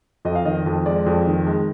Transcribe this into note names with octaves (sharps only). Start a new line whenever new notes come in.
F2 D#5
F5
D#3 D#5
F2
G#3 D5
F2
D#3
G#3